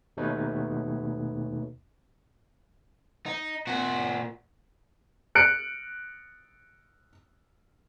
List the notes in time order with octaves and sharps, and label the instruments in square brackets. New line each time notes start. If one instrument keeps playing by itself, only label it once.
[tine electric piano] D#2 B2 A3 D#4 B4 C#5
[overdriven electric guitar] D#4
A#2 F#4
[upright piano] F#6 C#7 D7